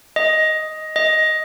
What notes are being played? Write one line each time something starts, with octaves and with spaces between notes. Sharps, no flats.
D#5
D#5